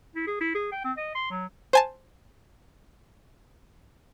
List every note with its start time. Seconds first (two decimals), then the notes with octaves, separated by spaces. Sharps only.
0.15 E4
0.27 G#4
0.40 E4
0.54 G#4
0.72 G5
0.84 C4
0.97 D#5
1.15 C6
1.31 F#3
1.73 C5 G#5 A5